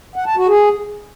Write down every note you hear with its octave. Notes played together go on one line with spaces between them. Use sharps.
F#5
A5
F#4
G#4